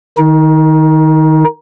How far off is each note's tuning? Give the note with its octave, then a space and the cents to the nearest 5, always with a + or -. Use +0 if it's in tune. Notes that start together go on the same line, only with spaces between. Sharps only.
D#3 -10 D#4 +25